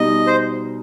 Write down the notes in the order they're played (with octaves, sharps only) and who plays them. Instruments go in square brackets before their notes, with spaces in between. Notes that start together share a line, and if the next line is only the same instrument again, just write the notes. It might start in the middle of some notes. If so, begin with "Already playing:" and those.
Already playing: [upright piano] B2 G3 D#4 [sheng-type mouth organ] D#5
[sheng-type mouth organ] C5